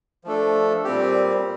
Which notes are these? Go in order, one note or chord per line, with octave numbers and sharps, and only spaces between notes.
F3 A3 D4 A4
A#2 G3 C4 G4